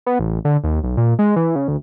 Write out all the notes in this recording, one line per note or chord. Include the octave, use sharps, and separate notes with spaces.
B3
A1
D3
D#2
B1
A#2
G#3
E3
C#3
D2